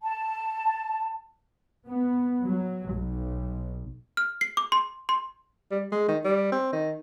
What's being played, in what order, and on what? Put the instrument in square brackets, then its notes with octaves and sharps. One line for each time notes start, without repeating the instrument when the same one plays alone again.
[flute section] A5
[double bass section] B3
F#3
B1
[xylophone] F6
C7
D6
C6
C6
[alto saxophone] G3
G#3
D#3
G3
C4
D#3